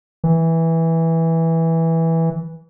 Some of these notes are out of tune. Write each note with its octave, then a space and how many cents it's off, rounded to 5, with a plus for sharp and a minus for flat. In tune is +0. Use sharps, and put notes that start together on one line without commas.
E3 -10